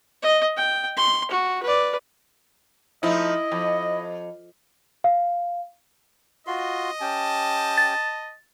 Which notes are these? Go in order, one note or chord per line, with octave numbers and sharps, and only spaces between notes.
D#5
G5
C6
F#4
B4 D5
F3 A3 D#4 E4 D#5
F2
F5
F4 F#4 D#5 C6
C#4 G4 G5 A5
A6